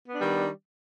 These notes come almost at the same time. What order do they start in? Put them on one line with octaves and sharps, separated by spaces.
B3 D4 G3 D#3